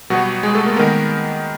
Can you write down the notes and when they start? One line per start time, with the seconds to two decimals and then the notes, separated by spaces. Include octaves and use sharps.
0.10 B2 F#3 G3 B3 F#4
0.43 G#3 G#4
0.54 A3 A4
0.66 A#3 A#4
0.76 D#3 G#3 A#3 B3 A#4